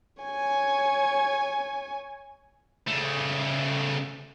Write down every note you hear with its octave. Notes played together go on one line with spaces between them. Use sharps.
C#5 G#5
C#3 A3